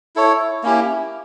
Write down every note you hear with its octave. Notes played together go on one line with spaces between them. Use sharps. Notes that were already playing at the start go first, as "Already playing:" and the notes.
E4 A4 C#5
A#3 C#4 E4 G4